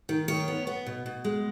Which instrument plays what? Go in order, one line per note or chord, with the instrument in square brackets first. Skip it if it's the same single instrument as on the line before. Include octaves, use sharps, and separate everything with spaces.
[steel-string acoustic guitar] D#3
D#3 C#5
B3
B3
B2
B2
G#3